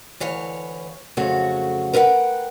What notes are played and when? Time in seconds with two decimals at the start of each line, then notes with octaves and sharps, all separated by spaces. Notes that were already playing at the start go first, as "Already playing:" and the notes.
0.20 D2 E3 C#5 F5
1.17 F2 C#3 F#3 A3 F#4
1.93 A#4 B4 E5 F#5 G5